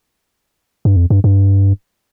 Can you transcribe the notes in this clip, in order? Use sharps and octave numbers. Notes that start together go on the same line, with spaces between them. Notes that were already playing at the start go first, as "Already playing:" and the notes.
G2
F2
G2
G2